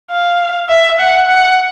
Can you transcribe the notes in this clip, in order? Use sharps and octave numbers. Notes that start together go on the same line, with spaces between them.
F5
E5
F#5
F#5